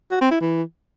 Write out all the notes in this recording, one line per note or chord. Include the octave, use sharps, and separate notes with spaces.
F#4
C4
E4
E3